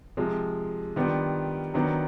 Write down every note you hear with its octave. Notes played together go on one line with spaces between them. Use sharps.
C3 F3 G#3
D#3 G3 B3 D4 F4
D#3 F#3 B3 D4